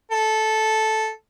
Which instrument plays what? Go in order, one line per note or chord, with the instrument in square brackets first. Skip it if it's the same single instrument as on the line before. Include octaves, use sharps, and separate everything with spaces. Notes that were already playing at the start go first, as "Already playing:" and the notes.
[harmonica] A4